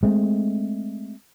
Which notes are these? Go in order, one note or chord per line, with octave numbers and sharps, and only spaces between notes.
G#3 A3 C4